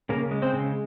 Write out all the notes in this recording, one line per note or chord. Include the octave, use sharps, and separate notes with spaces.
C#3 A#3 A#4
G#3
C4 C5
C#3